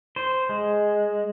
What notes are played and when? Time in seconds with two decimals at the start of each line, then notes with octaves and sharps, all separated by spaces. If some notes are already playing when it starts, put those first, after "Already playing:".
0.16 C5
0.49 G#3